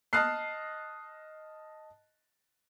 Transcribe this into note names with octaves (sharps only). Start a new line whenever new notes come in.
D#5 A5 D#6 F6 F#6 C7